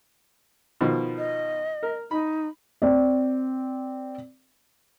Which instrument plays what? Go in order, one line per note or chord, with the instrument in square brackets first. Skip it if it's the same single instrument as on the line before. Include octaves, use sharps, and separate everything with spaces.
[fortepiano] B2 D#3 F3
[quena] D#5
[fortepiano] A#4
[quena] D#4 [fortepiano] B5
[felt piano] C4 D5